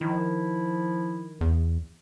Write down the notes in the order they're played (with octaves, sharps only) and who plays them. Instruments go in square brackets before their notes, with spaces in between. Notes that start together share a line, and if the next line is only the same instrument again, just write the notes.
[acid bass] D#3 [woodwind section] F3 E4
[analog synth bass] E2